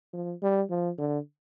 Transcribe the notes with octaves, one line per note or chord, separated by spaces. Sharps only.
F3
G3
F3
D3